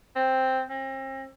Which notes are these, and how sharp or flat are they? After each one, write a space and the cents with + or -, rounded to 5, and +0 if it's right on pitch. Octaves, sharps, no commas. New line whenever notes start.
C4 +0
C4 +40